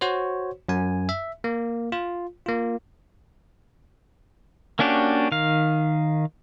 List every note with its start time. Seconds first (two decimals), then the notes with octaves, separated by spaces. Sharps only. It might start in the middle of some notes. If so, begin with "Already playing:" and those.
0.01 F#4 C5 C#5
0.69 F#2 G#5
1.09 E5
1.44 A#3
1.92 F4
2.46 A#3 F4
4.79 A#3 C#4 D4 F#4 G4
5.32 D#3 F5